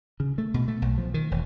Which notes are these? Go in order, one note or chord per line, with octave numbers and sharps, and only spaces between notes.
C#3
A3
B2
A3
B1
F3
D#3
E1